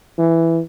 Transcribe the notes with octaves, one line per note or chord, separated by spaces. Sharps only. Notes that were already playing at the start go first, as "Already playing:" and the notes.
E3